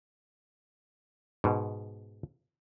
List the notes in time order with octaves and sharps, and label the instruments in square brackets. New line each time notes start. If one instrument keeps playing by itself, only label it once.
[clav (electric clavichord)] G#2 B2